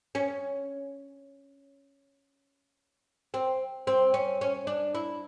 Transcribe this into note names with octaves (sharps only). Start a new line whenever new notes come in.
C#4
C4
C4
C#4
C#4
D4
E4